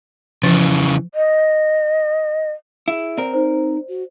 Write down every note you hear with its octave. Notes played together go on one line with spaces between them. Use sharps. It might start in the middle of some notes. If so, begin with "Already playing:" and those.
C#3 E3 F3
D#5
E4 G#4
C4 A#4 D5
D#4 C5
F#4